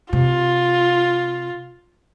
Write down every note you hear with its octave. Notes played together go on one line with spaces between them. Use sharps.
C3 F4